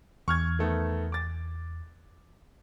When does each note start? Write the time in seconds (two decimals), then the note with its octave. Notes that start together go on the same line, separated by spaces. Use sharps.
0.28 E2 C#6 F6 G#6
0.59 D#3 A3 B3
1.12 D6 A6